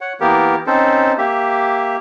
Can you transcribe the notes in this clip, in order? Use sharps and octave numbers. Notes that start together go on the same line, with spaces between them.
C#5 F#5
E3 A#3 B3 G4 A#4
C4 C#4 D#4 A4 C5
A#3 G4 E5